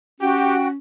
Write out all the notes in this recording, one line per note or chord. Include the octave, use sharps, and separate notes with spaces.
C#4 F#4 G4 G5